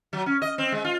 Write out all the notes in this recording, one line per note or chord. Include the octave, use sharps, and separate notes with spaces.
F#3
C#4
D#5
C4
G#3
F4